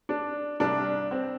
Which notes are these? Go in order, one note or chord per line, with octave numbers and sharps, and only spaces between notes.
D4
C2 C3 G3 D4
C4